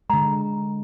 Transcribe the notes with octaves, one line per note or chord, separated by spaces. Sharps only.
D3 G#3 A#5